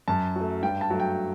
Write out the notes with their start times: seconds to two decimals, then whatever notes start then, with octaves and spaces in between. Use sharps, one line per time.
0.08 F#2 A5
0.36 F#3 A3
0.63 G2 G5
0.81 A5
0.90 F#3 A3
1.00 G5